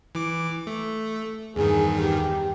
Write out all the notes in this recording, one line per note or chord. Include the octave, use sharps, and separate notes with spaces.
E3 D6
A3
E2 G2 D#3 G#4
G4